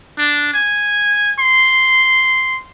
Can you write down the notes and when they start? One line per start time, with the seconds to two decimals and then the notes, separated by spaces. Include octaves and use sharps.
0.18 D4
0.54 G#5
1.40 C6